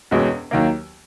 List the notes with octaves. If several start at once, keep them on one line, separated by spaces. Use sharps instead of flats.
E1 E2 B2 G#3 C#4
D#2 D#3 F#3 A#3